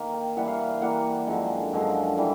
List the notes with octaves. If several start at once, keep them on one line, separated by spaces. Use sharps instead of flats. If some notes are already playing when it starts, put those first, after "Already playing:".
Already playing: D#3 A#3
G5
E3 G3 A#3 F#5
F5
F5
E3 G3 A#3 F#5
F#2 D3 F3 G#3
F#2 D3 F3 G#3
E3 G3